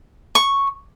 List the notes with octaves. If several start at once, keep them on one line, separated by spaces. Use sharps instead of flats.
C#6